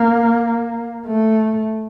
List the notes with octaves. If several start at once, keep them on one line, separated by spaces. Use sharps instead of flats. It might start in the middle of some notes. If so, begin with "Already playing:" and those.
Already playing: A#3
A3